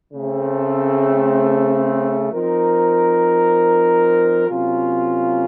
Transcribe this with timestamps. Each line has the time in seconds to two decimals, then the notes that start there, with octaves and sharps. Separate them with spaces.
0.13 C#3 A3 C4
2.31 F3 C4 D#4 A#4
4.48 C3 F#3 A#3 C#4 F4